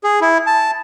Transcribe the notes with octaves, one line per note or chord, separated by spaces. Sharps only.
G#4
E4
A5